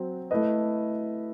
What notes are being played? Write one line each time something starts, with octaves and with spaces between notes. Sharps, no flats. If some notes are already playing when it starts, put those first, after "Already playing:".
Already playing: F#3 C4 F#4
A3 E4 B4 D#5